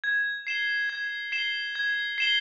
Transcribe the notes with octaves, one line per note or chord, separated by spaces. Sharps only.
G#6
C7 E7 G7
G#6
C7 E7 G7
G#6
C7 E7 G7